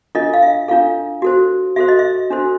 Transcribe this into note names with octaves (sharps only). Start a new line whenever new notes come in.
D4 F4 A4 D#5
F5
E5
D4 F4 A4 F5
F#4 A4 C5
F#4 A4 C5 E5
D#5
E5
D4 F#4 A4 C5